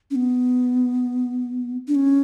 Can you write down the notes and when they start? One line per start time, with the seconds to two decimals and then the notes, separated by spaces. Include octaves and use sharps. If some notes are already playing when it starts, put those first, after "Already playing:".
0.11 C#4
0.15 B3
1.88 D4
1.95 C#4